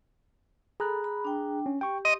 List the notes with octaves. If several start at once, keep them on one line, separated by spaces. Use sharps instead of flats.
G#4 A4 A#5 B5 F#6
B5
D4 G5
C#4
G4 G5 C#6
D#5 C6